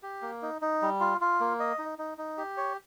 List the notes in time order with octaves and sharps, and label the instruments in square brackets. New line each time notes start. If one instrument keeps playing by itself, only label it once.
[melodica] G4
A#3
D#4
D#4
G3
F4
F4
A#3
D#5
D#4
D#4
D#4
G4
C#5